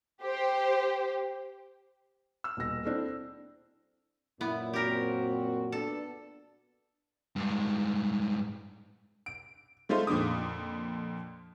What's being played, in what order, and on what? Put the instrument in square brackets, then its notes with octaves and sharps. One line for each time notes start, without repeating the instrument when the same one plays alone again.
[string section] G4 C5
[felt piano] E6 F6
D#1 B2 A#6
C4 D4 E4 A4 C5
[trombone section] F#2 A#2 [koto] B3 [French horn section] E4
[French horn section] C4 F#4 [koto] G4 A#4
[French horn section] B3 D4 D5 [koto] A4
[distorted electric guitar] G2 G#3
[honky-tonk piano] D7
G#3 A3 D#4 F4 C5
F2 A#2 D3 D6 D#6